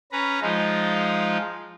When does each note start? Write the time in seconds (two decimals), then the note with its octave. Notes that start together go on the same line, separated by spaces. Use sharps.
0.12 C#4 B4 A#5
0.42 F3 G#3 D#4 F4